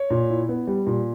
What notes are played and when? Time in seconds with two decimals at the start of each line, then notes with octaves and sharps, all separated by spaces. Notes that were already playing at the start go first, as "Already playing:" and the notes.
Already playing: C#5
0.10 A#2
0.30 E4
0.49 B3
0.67 G3
0.86 A#2